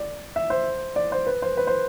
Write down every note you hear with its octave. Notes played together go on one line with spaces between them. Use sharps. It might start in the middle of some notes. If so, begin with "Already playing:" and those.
Already playing: D5
E5
C5
D5
C5
B4
C5
B4
C5